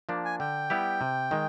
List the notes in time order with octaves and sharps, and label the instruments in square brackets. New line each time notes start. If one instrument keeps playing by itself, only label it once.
[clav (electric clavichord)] F3 A#3 D4
[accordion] G#5
[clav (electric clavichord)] D3 [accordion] G5
[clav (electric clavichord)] G3 B3 E4 G4
C3
D#3 G#3